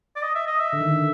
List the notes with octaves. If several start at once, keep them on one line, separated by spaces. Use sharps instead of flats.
D5
D#5
E5
D#5
E5
D3
D#3
D3